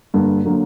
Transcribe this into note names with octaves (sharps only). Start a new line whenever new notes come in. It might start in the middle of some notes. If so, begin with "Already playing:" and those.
G2 D3 G3 A#3
D3 F#3 A#3